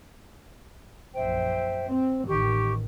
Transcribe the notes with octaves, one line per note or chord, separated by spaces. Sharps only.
A#1 F#2 C5 E5 G5
C4
A1 D#3 G4 C#6